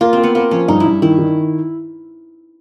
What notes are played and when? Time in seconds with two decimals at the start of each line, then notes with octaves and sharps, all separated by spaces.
0.01 A#3 F4
0.13 A#3 C4
0.24 B3
0.35 A#3 C4
0.51 F3 C#4
0.68 G2 D#4
0.80 E4
0.86 G2
1.02 D#3 E4
1.19 D#3